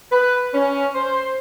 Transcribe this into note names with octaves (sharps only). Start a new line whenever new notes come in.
B4
C#4
C5